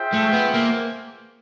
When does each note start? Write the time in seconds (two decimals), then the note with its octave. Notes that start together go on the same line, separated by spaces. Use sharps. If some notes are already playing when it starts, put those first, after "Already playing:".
Already playing: F4 G#4 C5 E5 G5
0.13 A3
0.33 B3
0.54 A#3